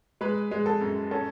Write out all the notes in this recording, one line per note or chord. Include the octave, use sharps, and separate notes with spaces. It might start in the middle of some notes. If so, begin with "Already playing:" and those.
G#3 B4
G#3
A4
F#2
C#4 A4